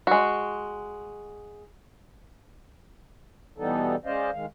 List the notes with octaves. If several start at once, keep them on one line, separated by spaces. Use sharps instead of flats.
G#3 F#4
B2 E3 G3 B3 D#4 A4
G#3 C#4 C5 D5 D#5 F5
D#3 G#3 F5